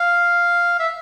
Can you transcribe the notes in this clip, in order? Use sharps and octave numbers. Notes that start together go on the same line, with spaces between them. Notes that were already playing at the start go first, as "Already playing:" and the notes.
Already playing: F5
E5